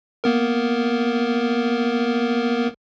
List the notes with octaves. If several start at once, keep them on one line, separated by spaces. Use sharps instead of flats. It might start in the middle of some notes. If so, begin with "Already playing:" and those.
A#3 B3 A#4